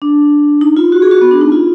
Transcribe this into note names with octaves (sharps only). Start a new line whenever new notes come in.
D4
D#4
F4
F#4
G#4
F#4
B3
D4
D#4
F4